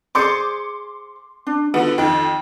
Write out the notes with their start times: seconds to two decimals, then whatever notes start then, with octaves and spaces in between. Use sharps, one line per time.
0.15 G#4 C5 D5 C6 D6 C#7
1.47 D4
1.74 D3 B3 F4
1.98 F2 D#3 G5